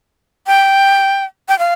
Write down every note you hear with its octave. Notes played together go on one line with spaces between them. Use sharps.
G5
G5
F5